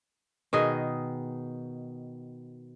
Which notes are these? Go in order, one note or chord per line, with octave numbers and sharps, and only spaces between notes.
B2 D#3 G#4 D#5